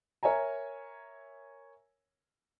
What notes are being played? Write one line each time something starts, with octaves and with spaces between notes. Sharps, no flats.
A#4 C#5 E5 G#5 A#5